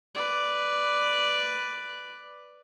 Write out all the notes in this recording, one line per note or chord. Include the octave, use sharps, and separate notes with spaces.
B4 D5